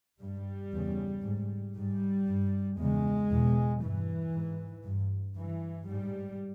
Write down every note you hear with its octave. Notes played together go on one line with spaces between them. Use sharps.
G2 G3
E2 C#3
G#2
G#2 G3
G2
E2 C#3 G#3
E2 B2
G2 E3
G#2
G2
G2 E3
G#2 G3